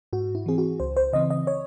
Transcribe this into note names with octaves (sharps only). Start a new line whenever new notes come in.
G#2 F#4
E4
E3 C4 G#4
F#4
C#2 C5
C5
C#3 E3 C4 D#5
D#5
C#5